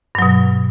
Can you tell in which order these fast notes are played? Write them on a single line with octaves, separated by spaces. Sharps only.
G2 F#3 B2